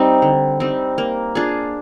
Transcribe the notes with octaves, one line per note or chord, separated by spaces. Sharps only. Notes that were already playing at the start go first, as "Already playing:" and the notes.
Already playing: G3 C4 D#4
D3
G3 C4 D#4
A#3
D4 F4 G#4